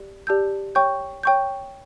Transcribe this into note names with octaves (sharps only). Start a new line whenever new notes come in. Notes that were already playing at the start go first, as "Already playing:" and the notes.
Already playing: G4 D5
G4 D5 A5 E6 G6
C#5 G5 C#6 G6
C#5 G5 C#6 G6